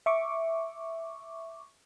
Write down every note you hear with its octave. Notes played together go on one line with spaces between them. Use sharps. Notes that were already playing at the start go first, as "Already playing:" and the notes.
E5 C#6 D6